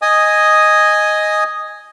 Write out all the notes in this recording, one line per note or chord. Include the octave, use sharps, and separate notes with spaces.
D#5 G#5 D#6